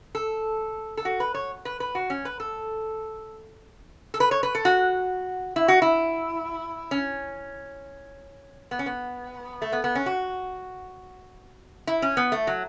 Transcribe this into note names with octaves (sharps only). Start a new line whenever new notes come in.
A4
A4
F#4
B4
C#5
B4
B4
F#4
C#4
B4
A4
A4
B4
C#5
B4
A4
F#4
E4
F#4
E4
C#4
B3
C#4
B3
A3
B3
B3
C#4
F#4
E4
C#4
B3
A3
F#3